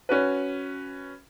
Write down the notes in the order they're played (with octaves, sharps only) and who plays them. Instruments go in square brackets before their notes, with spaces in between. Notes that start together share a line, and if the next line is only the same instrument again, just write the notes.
[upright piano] C#4 F#4 B4